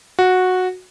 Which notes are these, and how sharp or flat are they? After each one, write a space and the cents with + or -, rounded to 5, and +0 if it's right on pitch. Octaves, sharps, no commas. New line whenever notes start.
F#4 -10